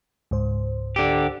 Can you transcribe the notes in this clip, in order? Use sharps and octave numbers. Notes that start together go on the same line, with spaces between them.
C#2 G#2 C5
D3 G4